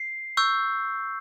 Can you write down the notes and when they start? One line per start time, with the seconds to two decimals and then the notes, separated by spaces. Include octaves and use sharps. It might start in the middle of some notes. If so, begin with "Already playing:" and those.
Already playing: C7
0.37 C#6 E6 G6